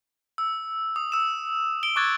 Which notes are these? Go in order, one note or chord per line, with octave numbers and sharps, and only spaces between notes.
E6
D#6
E6 E7
D7 G7
C#6 D6 F#6 G#6 A6